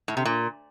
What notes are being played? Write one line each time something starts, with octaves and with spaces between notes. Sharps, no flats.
A2
C3
A#2